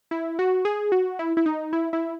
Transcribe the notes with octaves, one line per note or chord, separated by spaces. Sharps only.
E4
F#4
G#4
F#4
E4
E4
D#4
E4
E4